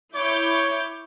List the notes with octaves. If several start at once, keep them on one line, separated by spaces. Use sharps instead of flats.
E4 C#5 D6 G6